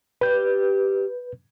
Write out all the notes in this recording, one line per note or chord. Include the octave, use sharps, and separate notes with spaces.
G3 G4 B4 G6